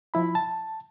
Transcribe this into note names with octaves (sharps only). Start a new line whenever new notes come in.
F3 E4 B5
A5